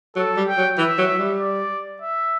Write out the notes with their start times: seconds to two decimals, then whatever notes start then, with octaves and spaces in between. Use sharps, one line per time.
0.16 F#3 A4
0.37 G3
0.47 G5
0.58 F#3
0.78 E3 E5
0.98 F#3
1.19 G3
1.40 D5
2.02 E5